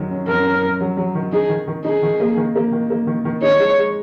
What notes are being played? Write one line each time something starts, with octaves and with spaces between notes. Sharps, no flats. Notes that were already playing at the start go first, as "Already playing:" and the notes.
Already playing: F#2 D#3 F#3 C#4
C#4
F#2 A#4
C#4
F#2
F#3
F#3
D#3
D#4 G#4
D#3
D#3
D#4 G#4
D#3
A#3
D#3
A#3
D#3
A#3
D#3
D#3
D#4 C#5
G#3
G#3